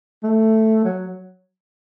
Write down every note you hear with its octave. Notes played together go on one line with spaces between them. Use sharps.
A3
F#3